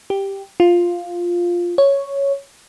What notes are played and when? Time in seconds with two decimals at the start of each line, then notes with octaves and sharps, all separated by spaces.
0.10 G4
0.60 F4
1.78 C#5